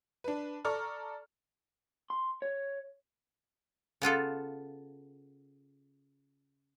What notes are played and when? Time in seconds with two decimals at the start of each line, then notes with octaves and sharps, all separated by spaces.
0.24 D4 B4
0.65 A4 D5 A#5 C#6 F6
2.10 C6
2.42 C#5
4.02 C#3 B3 F4 A4